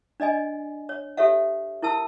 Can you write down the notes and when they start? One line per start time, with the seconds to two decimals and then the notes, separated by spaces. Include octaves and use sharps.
0.20 D4 D5 D#5 G#5
0.89 C#5
1.17 G4 A4 C#5 E5 F5
1.82 E4 A#4 A5 E6